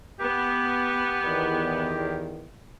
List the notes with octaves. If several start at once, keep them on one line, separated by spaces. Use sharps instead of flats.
B3 G4
E2 D#3